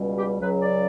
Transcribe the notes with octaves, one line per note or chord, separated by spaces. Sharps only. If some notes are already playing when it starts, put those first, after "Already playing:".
Already playing: C#2 B2 G3
G4
C#2 C#3 F#3 B4
D5